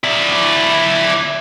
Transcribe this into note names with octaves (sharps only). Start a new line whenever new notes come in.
E4 D5